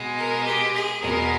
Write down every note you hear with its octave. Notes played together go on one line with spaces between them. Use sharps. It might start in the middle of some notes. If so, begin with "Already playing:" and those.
Already playing: B2 G#3
A#4
G4
G#4
E2 B2 G#3 A#4